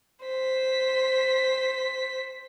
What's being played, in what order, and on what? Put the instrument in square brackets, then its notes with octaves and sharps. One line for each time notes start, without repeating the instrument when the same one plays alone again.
[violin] C5 B6